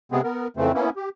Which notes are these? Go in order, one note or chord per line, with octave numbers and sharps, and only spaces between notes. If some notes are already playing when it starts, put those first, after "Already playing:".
C3 G#3 B3 C4 G#4
B3 A#4
F2 C#3 E3 A3 C4
A#3 B3 C#4 E4
G4